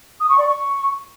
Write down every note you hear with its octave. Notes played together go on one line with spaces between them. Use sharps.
D#6
C#6
D5
C#6